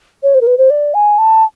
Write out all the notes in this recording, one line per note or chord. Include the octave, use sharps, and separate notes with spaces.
C#5
C5
A#4
B4
C5
D5
G#5
A5